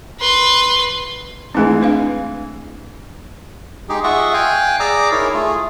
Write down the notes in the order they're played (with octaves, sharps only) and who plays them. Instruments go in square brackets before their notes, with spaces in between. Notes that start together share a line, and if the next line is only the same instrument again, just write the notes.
[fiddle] B4 C6
[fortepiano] G#2 E3 G#3 [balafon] A3 C4
[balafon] D4 B4 F5
[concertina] G#3 D#4 G4 G#4
F4 G#4 D#5 E5 F#5 C#6
F5 G5 G#5 F#6
G#4 D5 A#5 D6 E6
D#4 E4 G#4 A#4 C#5
A3 F4 G#4